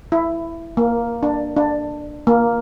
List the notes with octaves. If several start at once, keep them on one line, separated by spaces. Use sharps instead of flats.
E4
A#3
D4
D4
A#3